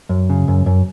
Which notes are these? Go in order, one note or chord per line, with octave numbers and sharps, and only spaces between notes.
F#2
C#3
F#2
F#2